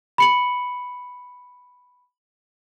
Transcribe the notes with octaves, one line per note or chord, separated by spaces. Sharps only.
B5 C#7 F#7